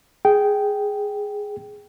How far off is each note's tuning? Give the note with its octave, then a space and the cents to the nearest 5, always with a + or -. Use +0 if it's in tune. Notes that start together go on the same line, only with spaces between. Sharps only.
G#4 +0 G5 -10